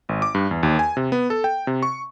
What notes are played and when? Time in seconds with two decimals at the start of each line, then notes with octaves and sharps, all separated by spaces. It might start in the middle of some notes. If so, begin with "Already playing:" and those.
0.09 G#1
0.22 D6
0.35 G2
0.51 E2
0.63 D#2
0.79 G#5
0.97 C3
1.12 B3
1.30 A4
1.44 G5
1.67 C3
1.83 C#6